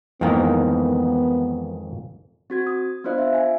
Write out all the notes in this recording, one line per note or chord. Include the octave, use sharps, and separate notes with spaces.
F2 G#2 D#3 E3 A#3 B3
C4 F#4 G#6
D#6
B3 D4 F4 C5 D#5 F5
E5
G#5